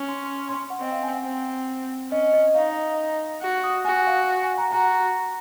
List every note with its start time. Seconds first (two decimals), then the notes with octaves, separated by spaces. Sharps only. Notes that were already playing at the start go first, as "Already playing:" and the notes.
Already playing: C#4
0.09 C6
0.23 C6
0.38 C6
0.49 C6
0.70 F#5
0.80 C4 D#5
0.92 F5
1.03 G#5
1.13 F#5
1.25 C4
2.11 C#4 D#5
2.33 D#5
2.55 D#4 F5
3.42 F#4 F#5
3.64 D#6
3.85 F#4 G#5
4.07 F5
4.43 G#5
4.58 A#5
4.72 F#4 A#5